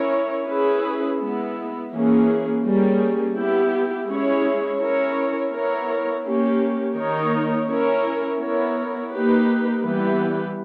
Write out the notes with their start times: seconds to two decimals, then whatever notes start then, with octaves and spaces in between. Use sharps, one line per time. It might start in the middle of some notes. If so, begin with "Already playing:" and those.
Already playing: C#4 E4 A#4 C#5
0.47 C#4 E4 G#4 B4
1.19 G#3 B3 E4
1.91 E3 A#3 C#4 G#4
2.63 G3 A#3 C#4 G#4
3.35 B3 E4 G4
4.07 G#3 C#4 E4 G#4 C#5
4.79 C#4 E4 A#4 C#5
5.52 B3 E4 A#4 C#5
6.24 A#3 C#4 G4
6.95 D#3 A#3 D#4 A#4 C#5
7.68 C#4 E4 A#4 C#5
8.40 B3 E4 A#4 C#5
9.12 A#3 D#4 G4 B4
9.83 E3 G3 B3 G4 B4